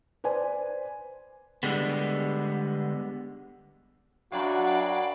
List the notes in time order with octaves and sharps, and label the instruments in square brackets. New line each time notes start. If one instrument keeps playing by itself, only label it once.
[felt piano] B4 C5 D5 G#5
[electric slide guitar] D3 G3 G#3 B3
[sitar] F#2 [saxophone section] F#3 D4 [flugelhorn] F#4 [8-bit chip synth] F5 G5 B5